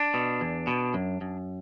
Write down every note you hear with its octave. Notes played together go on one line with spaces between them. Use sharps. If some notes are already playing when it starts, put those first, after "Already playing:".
Already playing: D4
B2
E2
B2
F#2
F#2